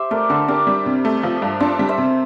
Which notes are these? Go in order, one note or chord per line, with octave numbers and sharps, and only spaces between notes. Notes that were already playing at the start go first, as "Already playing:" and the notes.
Already playing: G4 C5 E5
A3 A#4 D5
D3 A4 C5
D4 G4 A#4
G3
C3
A3
F3
G2
D4 A4 C5
G3
C5 E5
C3